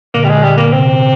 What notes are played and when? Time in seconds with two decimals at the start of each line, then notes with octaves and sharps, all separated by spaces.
0.14 A#2 D3 A#3
0.24 G3
0.29 G#3
0.43 G3
0.57 A#3
0.73 C3 C4